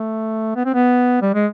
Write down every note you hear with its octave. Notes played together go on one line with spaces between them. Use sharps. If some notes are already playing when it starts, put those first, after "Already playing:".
Already playing: A3
B3
C4
B3
G3
G#3